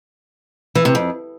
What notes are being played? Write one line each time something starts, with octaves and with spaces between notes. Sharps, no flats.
E3
C3
F2